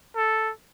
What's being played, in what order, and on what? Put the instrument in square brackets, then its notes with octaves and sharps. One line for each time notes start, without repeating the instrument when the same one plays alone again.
[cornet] A4